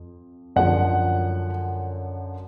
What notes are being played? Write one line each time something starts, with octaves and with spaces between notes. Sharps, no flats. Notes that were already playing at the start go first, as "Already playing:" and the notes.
Already playing: F2
F#2 D3 F3 F#5